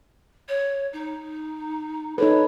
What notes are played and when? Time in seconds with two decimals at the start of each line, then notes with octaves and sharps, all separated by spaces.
0.49 C#5
0.93 D#4
2.18 D#4 A4 B4 C#5